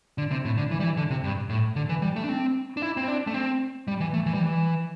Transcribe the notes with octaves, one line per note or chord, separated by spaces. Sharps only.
D3
C3
A2
D3
E3
G3
E3
D3
C3
G2
A2
D3
E3
G3
A3
D4
C4
D4
E4
C4
D4
A3
C4
G3
E3
A3
E3
G3
E3